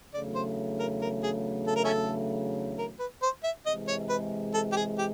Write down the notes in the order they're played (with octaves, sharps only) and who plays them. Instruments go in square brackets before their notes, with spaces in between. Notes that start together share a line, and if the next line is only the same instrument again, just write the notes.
[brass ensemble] E2 C#3 F#3 A3 D4 [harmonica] D5
[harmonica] C5
A#4
A#4
G#4
A4
A#4
C#4 E4 A4
A#4
B4
C5
E5
[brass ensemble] C3 E3 G#3 [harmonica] D#5
[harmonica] C#5
B4
A4
G4
G#4
G4